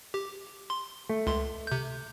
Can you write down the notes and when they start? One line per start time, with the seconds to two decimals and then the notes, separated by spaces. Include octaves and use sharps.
0.14 G4
0.70 C6
1.09 A3
1.27 C#2 C6
1.67 C3 G6